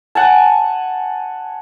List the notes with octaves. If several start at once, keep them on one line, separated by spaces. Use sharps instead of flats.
F#5 G#5 A5